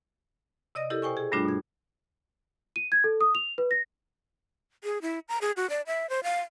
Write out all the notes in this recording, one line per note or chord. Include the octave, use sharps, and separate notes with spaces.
C3 D5 D#5 D#6 A#6
E4 G4 A4 A#4
B2 C5 G5 G#5 C#6
G#4
G2 G3 A3 D4 F4 F#4
B2 G#6
D#7
G#6
A4
D#6
F7
B4
A#6
G#4
E4
A#5
G#4
F#4
D5
E5
C5
F5